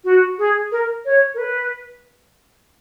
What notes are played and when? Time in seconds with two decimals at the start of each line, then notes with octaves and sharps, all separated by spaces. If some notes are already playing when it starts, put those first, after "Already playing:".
0.04 F#4
0.38 G#4
0.72 A#4
1.05 C#5
1.34 A#4
1.38 B4